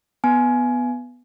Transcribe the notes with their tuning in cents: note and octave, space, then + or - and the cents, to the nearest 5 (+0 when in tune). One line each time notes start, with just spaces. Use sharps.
B3 +0 G#5 +20